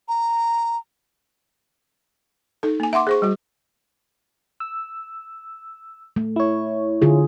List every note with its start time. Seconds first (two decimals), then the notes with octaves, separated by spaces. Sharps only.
0.08 A#5
2.63 D#4 A4
2.80 A#3 G#5
2.93 E5 F#5 C6 D6
3.07 G#4 C5 C#6
3.22 G3 F#4
4.60 E6
6.16 A3
6.36 E4 C#5
7.02 D3 F4 G#4